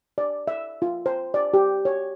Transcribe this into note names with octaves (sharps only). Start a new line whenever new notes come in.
D5
E5
F4
C5
D5
G4
C#5